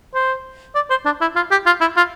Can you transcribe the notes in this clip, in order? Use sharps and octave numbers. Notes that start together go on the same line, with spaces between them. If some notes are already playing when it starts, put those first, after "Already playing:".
C5
D5
C5
D4
E4
F4
G4
F4
E4
F4